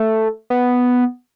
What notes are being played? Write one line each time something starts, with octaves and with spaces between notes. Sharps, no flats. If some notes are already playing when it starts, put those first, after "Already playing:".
Already playing: A3
B3